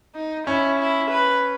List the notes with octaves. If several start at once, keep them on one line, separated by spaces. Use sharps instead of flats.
D#4
C#4 E4
E4
B4